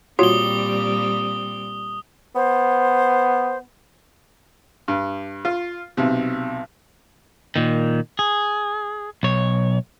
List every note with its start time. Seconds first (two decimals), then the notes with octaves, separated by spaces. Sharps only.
0.19 A#2 G3 C4 F4 F#4 C#5 D#6 G7
2.35 B3 C5
4.88 G2
5.45 F4
5.97 B1 C3
7.56 A#2 D#3
8.19 G#4
9.23 B1 C#5